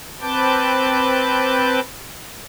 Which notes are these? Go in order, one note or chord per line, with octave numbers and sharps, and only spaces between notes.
C4 B4 A5 D6 G6